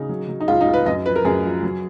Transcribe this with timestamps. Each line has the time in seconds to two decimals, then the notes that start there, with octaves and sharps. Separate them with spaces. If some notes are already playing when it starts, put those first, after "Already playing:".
Already playing: C#3 D#4
0.09 F#3
0.29 F#3
0.40 D#4
0.48 C#2 F4
0.61 D#4
0.67 C#2
0.74 B4
0.86 F#2 D#5
1.06 F3 B4
1.16 A#4
1.25 F#2 G#4
1.44 F3
1.63 F#3